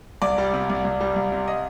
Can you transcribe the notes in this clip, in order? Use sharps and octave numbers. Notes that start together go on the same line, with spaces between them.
C2 D5
G3
C3
C2
C2
G3
C2
C3
D#5